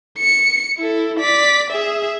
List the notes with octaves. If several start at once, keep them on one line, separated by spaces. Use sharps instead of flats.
C#7
E4 A4
D5 B6
G#4 E5